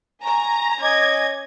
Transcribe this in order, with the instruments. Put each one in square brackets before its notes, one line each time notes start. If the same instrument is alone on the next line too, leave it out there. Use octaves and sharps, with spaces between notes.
[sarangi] G#5 [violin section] A#5 [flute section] C#6
[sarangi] C#4 [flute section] D#5 G#5 D6 [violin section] G#6